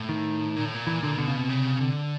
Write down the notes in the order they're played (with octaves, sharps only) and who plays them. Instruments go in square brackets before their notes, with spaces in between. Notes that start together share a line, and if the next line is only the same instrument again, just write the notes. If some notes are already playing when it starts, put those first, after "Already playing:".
Already playing: [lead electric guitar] A2
[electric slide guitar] D#3
[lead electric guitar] A#2
A2
A#2
[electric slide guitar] E3
D3
[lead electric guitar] B2 [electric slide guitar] D3
[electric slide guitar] C#3
C3
[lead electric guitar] C#3
D3